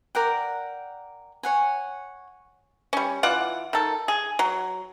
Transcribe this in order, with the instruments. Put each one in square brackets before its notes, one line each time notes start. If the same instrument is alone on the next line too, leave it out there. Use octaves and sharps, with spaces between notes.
[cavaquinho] A#4 D5 F#5 G5
C#5 F#5 G#5
[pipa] G3 C#4
E3 F4 D5 F#5
D#3 A4
G#4
F#3